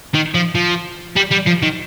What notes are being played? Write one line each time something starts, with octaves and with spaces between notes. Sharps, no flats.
D#3
F3
F3
G3
G3
F3
D#3